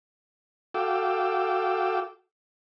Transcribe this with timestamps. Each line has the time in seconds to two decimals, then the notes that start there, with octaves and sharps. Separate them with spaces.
0.74 F#4 A4 F5 G5 D6 E6